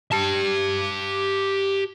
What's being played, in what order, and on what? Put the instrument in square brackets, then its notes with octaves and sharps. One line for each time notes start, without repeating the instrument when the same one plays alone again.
[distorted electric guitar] G4 A5